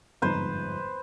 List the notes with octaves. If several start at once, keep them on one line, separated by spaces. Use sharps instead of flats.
G1 F2 G#2 B4 C5